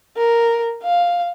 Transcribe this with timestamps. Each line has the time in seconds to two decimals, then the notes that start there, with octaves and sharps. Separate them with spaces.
0.17 A#4
0.84 F5